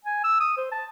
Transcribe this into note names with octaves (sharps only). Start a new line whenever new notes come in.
G#5
E6
D#6
C5
A5